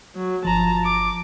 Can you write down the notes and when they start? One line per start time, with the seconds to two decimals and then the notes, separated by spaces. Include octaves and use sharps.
0.15 F#3
0.45 G1 F3 A5 A#5
0.85 D6